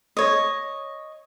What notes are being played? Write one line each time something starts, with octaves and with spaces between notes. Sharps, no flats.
C#5 D#5